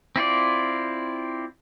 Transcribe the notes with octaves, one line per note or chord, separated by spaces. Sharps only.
C4 E4 F4 D5